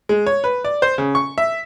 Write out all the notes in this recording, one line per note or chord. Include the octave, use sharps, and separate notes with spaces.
G#3
C#5
B4
D5
C5
C#3
C#6
E5